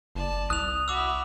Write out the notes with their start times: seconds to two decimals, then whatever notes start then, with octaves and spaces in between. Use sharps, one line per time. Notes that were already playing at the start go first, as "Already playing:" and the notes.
0.15 F#1 D5 A5
0.50 C2 D#6 F#6 F7
0.88 E4 F#4 D6 E6